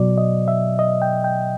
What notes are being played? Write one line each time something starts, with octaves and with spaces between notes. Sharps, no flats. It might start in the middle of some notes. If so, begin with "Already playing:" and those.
Already playing: B2 F#3 D5
D#5
E5
D#5
G5
G5